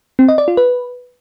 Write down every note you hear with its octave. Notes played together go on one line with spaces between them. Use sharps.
C4
D#5
D5
F4
B4